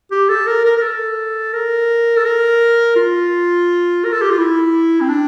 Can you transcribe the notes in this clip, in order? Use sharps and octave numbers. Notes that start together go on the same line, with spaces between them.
G4
A4
A#4
A#4
A#4
A4
A#4
A4
A#4
F4
A#4
A4
G4
F4
E4
C4
D4